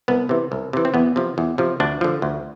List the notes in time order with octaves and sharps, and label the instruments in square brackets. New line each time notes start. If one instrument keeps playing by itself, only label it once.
[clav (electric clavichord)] C2 B3
C3 E3
C2
C3 E3
C4
E2 B3
C3 F3
E2
C3 F3
D2 D4
D3 F3
D2